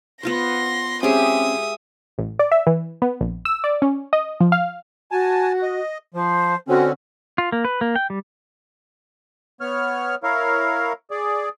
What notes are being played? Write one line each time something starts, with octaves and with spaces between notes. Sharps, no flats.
B3 F4 C5 C6 A#6
G#3 C4 C#4 G4 G#4 E5 D#6
A1
D5
E5
E3
B3
A#1
E6
D5
C#4
D#5
F3
F5
F#4 G#5 A5
D#5
F3 C5
D3 C4 C#4 F#4
F4
A#3
B4
A#3
G5
G3
B3 C#5 F6
E4 A#4 C#5 F5
G#4 D5